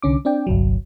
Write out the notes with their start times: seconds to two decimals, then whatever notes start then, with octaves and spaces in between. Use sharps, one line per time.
0.02 C2 D3 C#4 D6
0.25 C4 D4 D5 G5
0.47 G1 C2 F#3